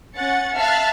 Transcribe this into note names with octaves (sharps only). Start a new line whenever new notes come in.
C#4 F#5 A6 C#7
E5 F5 A5 F6 F#6 A6